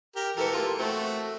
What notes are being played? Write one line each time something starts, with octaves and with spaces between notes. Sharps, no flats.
G4 A#4
E3 B3 G4 A4 A#4
A#3 F4
A3 C4 F#4